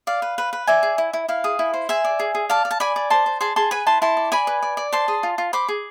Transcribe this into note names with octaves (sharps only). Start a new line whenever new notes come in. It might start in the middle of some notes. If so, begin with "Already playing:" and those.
D5 F5
B4
B4
B4
D5 E5 G#5
G#4
E4
E4
E4 F5
G#4
E4
C5
G#4 E5 G#5
D5
G#4
G#4
D5 F5 A5
D5
A5
D5 G#5 B5
D5
C5 A5 C6
C5
G#4 A5 C6
G#4 A5 C6
B4 G#5 B5
E4 A5 C6
E4 A5 C6
D5
D5 G#5 B5
B4
D5
D5
C5 A5 C6
G#4
F4
F4
C5 B5 D6
G#4